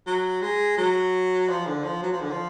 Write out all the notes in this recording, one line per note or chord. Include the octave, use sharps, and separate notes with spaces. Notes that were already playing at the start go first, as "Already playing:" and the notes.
F#3
G#3
F#3
F3
D3
F3
F#3
F3
D3
F3